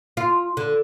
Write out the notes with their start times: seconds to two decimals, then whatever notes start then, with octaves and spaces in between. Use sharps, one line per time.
0.17 F4
0.57 D3